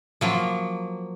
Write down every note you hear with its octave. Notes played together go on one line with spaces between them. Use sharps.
F3 F#3 A#3